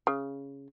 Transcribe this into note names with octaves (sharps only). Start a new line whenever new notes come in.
C#3